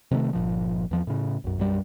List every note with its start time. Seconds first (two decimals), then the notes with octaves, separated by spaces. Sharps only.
0.11 C3 D#3 G#3 A3
0.33 G1 C2 A#2 F3
0.91 E2 F3
1.07 A2 C#3
1.44 B1 F#2
1.58 B1 F#2 G3